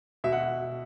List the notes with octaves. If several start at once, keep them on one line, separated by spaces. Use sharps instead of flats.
B2 E5
F#5